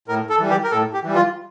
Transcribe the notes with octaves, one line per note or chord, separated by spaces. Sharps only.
A2 A#4
A4
E3 G3
G4
A#4
A2 A4
G4
E3 G3
F4